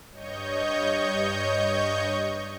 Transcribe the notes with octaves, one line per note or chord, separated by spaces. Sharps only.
G2 C#5 D#5 C#6 G6